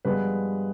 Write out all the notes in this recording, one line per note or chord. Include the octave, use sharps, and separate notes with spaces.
G2 F3 G#3 B3 B4